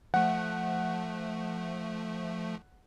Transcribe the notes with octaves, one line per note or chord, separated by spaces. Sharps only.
F3 A3 F#5